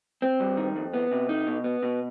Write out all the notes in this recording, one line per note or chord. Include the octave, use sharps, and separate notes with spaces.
C4
G2
D#3
F2
B3
C3
D#4
B2
B3
B2